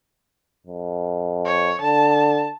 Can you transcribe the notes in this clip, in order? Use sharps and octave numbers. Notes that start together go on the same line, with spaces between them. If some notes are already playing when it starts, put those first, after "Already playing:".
F2
C#5
D3 A5